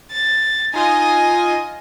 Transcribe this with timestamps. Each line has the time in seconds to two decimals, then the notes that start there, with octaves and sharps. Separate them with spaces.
0.11 A6
0.74 D#4 F4 D#5 G#5 A#6